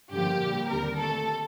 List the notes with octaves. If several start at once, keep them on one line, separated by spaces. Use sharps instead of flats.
G2 D3 F3 A#3 G4
A#2 G3 A#3
D#2 D3 G3 C4 A#4
A#2 A3 C4 A4